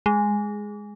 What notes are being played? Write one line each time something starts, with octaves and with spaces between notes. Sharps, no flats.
G#3